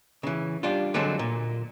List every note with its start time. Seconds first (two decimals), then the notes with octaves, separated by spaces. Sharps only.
0.23 C#3 E3
0.63 G3 D4 F4
0.94 D3 F#3 G#3 C4 A4
1.19 A#2